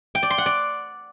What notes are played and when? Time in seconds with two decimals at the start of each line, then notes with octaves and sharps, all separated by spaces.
0.15 G5
0.23 D5
0.30 C6
0.38 F#5
0.46 D5